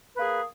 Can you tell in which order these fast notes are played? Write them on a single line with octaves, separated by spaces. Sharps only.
B4 A#3 G#4